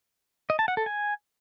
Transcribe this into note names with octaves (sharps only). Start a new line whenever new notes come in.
D#5
A5
F#5
A4
G#5